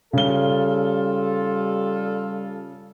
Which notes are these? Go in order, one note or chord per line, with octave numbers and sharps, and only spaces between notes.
C#3 G3 F4 A4 G7